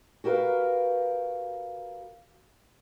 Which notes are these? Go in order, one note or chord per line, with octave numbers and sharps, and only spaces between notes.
F#4 G4 A#4 B4 F5